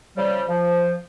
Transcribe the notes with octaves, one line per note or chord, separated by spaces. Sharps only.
C#3 F3 G3
F3